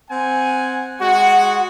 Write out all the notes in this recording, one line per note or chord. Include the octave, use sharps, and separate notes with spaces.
C4 F#5 G#5
G#3 F#4 F#5